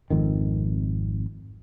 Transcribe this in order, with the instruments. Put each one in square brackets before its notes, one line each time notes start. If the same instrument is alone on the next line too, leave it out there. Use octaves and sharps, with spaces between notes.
[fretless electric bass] G#1 F2 D#3